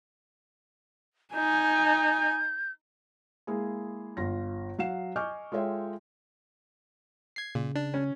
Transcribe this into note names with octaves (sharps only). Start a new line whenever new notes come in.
D#4 G#5 G6
G#3 A#3 E4 G#4
G1 F4 A#6
F#3 F5 F#5 C7 E7
D#5 G#5 C#6 D6 F6 G6
G#3 F4 A4 C#5 E5 G5
G#6 C7
A#2 C#3
D4
C#4